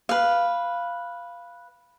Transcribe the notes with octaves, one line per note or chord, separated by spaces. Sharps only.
B4 F5